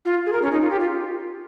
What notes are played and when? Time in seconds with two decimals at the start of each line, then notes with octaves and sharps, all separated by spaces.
0.05 F4
0.26 G#4
0.33 A#4
0.42 C#4
0.52 D#4
0.62 F4
0.70 G4
0.80 F4